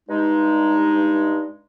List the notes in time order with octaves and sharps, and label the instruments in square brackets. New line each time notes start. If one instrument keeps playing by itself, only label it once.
[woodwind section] G2 G#3 D#4